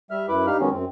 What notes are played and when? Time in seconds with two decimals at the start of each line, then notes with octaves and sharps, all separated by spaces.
0.11 G3 E5 F6
0.29 F#2 E4 B4 B5 D6
0.47 G2 G3 D#4 G4 F5 F6
0.60 D#3 F#3 G#3 B3 C#4
0.71 F#2 C4